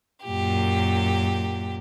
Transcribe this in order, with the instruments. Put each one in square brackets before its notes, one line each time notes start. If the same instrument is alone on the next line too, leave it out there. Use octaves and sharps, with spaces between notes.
[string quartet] F#2 A#2 G4